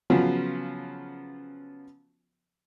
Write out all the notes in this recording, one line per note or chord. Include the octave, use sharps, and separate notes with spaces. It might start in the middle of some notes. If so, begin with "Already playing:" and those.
C#3 F3 F#3 B3 C#4 F4